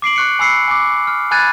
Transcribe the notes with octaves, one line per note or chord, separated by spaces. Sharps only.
D6 C7 D7 F#7
C#6 F#6 C#7
G#5 B5 E6 C7 C#7
G#5 D6
F6
G#5 B5 F#6 G#6 A6 D#7